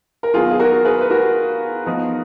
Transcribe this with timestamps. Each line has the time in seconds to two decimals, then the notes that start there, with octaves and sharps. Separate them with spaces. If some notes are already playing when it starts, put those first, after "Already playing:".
0.23 A#4
0.34 D#3 F#3 B3 F4 G#4
0.51 G#4
0.59 F#4 A#4
0.85 G#4 B4
1.01 B4
1.10 F#4 A#4
1.86 F3 B3 D#4